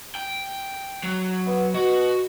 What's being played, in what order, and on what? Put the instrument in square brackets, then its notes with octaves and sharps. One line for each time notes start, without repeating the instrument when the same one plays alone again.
[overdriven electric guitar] G5
F#3
[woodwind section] B3
[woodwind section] B2 [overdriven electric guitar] F#4